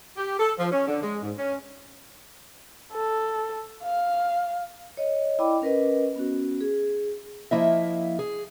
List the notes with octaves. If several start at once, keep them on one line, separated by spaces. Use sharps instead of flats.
G4
A4
F3
C#4
D3
G#3
G#2
C#4
A4
F5
C#5 D#5
E4 D5 D#5 G5 B5 D6
C#4 A#4 B4 D#5
B3 C#4 F#4
G#4
F3 A#3 E4 D#5 E5
G#4